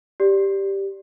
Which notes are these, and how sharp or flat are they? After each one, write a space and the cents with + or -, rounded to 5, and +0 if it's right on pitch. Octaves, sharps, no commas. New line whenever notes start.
G4 +0 D5 -5